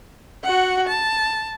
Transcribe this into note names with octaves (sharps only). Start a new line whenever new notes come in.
F#4 F#5
A5